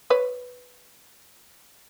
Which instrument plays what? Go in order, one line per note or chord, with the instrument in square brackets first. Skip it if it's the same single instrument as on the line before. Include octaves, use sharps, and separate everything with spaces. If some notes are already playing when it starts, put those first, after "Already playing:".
[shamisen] B4 C#5